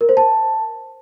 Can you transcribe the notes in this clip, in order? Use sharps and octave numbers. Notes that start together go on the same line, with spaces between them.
A#4
C5
A5